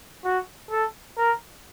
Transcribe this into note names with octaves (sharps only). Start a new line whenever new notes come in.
F#4
A4
A#4